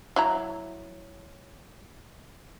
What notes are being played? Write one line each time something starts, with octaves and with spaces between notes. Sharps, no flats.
F#3 E4 A#5